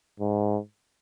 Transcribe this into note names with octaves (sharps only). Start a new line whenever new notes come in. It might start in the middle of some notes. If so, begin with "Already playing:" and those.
G#2